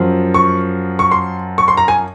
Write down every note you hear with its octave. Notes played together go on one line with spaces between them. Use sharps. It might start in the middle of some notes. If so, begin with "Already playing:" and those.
Already playing: F#2 F3
C#6
C#6
C6
C#6
C6
A#5
G#5